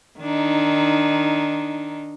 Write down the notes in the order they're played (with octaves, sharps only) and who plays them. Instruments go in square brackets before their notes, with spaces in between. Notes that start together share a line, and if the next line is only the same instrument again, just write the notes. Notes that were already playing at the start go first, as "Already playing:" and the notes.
[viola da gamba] D#3 D4 D#4